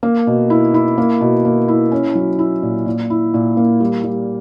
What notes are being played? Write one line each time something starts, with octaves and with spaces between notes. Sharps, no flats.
A#3
B2
E4
E4
A#3
B2
A#3
E4
C#4
F#3
E4
A#2
A#2
E4
A#2
A#3
G3
G3